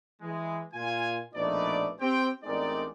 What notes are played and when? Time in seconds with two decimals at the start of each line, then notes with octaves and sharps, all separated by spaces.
0.22 E3 G#3
0.74 A#2 F4 G#5
1.35 A#1 B2 A3 D#4 B4 D5
2.00 C4 G4 G5
2.44 A1 G#3 C4 D#4 A#4 D5